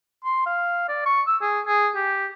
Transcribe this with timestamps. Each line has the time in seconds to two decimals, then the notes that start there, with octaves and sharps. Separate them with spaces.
0.25 C6
0.46 F5
0.89 D5
1.06 C#6
1.27 E6
1.42 G#4
1.66 G#4
1.96 G4